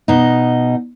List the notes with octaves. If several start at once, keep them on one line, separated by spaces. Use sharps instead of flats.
B2 D#4